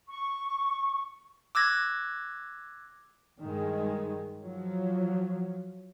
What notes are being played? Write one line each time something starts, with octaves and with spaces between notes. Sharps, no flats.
C#6
D6 E6 F#6 G#6 A#6
G2 D#3 G#3
F3 F#3